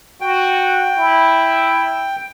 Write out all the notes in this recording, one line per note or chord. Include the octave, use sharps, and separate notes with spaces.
F#4 G5
E4